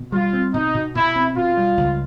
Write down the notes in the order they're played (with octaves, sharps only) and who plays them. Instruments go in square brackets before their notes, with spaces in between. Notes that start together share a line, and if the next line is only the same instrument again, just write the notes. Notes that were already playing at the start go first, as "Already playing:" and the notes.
Already playing: [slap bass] B2
[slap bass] G3 [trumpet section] F4
[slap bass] C4
[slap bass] B2 [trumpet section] D#4
[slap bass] B2
[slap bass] B2 [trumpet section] E4
[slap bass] C4
[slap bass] B2 [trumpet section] F4
[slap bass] G3
C#2